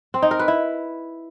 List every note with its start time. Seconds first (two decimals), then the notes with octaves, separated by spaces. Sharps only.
0.14 C4
0.22 D#4
0.31 A#4
0.39 B4
0.48 E4